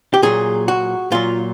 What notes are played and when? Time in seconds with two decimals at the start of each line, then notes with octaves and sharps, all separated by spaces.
0.14 G4
0.23 A#2 F#3 G#4
0.68 F#4
1.12 A#2 F#3 F4